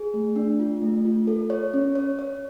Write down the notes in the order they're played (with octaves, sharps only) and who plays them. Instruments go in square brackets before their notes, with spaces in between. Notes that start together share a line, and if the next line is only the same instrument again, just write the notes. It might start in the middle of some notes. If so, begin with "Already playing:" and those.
Already playing: [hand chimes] G#4
A3
D4
F4
A3
F4
A4
C#5
C#4
C#5
C#5